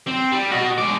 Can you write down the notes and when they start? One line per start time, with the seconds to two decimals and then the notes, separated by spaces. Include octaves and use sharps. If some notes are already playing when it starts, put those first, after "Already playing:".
0.07 C4
0.31 G3
0.52 F#4 D#5
0.78 G#3 D5